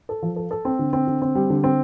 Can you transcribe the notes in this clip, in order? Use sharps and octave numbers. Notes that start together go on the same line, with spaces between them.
A4
F3
A4
A4
C4
D3
C4
D3
C4
G3
D3
C4